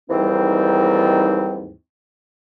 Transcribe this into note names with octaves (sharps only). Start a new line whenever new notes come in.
D#2 G#2 E3 G3 C4 D#4